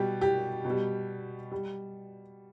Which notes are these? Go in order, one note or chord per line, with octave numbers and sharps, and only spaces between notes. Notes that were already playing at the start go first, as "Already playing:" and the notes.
Already playing: B2 G3 G4
G4
B2
G3
G3